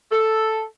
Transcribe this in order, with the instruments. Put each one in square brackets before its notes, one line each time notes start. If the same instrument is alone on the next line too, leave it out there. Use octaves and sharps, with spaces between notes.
[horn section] A4